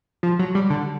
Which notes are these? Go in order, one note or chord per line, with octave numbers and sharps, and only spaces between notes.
F3
F#3
G3
D3